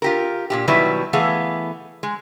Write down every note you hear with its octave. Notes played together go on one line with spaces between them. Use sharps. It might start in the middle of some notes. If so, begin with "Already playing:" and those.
F4 G4 A#4
A#2 C#3 G4
B2 D#3 F#3 G3 E4 B4
E3 A3 B3 G#4 F5
G#3